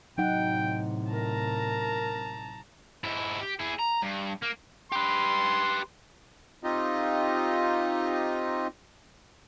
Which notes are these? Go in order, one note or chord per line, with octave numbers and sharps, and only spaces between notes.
A2 C3 F#3 D#4 F#5 G5
A#4 A5 A#5
G#2 E4
G4
E4 G#4
A#5
G2
A#3
G4 B4 C6
C4 D#4 F4 G4 D#5